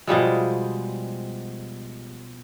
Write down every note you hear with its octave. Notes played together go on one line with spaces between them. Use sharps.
B2 F3 G3 G#3